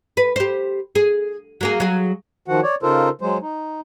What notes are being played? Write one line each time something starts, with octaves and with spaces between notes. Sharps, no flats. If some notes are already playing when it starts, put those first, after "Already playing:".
B4
G4 C5
G#4
F#3 A#3 G#4
F#3 G#4
D#3 F3 F#4 F#5
C#5 D5
C#3 D#4 F4 A4 A#4 C5
F#3 G#3 C5
D#4